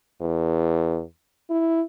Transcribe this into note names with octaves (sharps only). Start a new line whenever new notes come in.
E2
E4